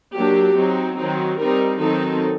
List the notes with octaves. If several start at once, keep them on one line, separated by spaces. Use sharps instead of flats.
F#3 A#3 D4 G4
F#3 C4 D#4
D#3 F#3 C4 D#4
G3 C4 D#4 A#4
D#3 F#3 C4 D#4 A4